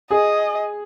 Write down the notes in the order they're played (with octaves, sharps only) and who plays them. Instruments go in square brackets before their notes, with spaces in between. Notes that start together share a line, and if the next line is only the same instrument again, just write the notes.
[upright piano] G#4 [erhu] D#5